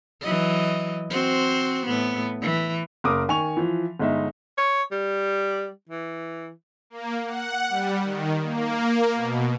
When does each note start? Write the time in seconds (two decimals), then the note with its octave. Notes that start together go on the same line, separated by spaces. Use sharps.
0.21 E3 F#3 D#5
1.10 C4 F#4 C5
1.86 A2 B3
2.41 E3
3.04 F#1 A#4 D6 D#6
3.29 D#3 G#5 C#6 F7
3.57 E3 F3
3.99 G1 G#3 D#4 E5
4.58 C#5
4.92 G3
5.89 E3
6.90 A#3
7.26 F#5
7.69 G3
8.04 D#3
8.43 A#3
9.14 B2